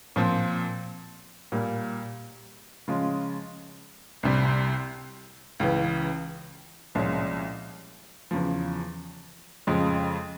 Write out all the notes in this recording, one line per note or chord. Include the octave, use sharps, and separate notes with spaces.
A#2 F3 C4
A#2 G3 A#3
C#3 F3 G#3 C#4 F4
C2 C3 G3
C#2 C#3 E3
C2 A#2 F3 G#3 C#4
E2 C#3 F3
F2 C#3 F3 G#3